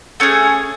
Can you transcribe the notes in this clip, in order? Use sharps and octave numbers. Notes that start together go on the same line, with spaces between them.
A3 C#4 G#4